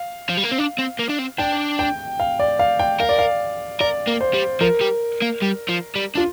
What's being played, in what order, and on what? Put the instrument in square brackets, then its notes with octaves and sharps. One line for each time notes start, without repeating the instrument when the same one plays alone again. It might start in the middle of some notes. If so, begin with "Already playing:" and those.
Already playing: [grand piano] F5
[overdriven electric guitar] F3
G3
A#3
C4
D4
C4
A#3
D4
C4
[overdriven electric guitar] D4 [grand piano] G5
[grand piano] G5
F5
D5
F5
G5
[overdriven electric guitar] A#4 [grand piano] F5
[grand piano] D5
F5
[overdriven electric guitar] A#4 [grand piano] D5
[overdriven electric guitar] A#3
[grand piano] C5
[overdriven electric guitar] G3
[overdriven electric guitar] F3 [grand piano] A#4
[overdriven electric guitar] G3
A#3
G3
F3
G3
[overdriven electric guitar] D4 [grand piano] F4